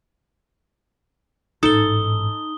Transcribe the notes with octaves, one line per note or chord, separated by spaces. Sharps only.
A1 G#2 D#4 A4 D#6 G7